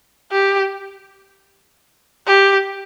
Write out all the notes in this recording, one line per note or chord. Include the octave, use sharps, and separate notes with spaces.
G4
G4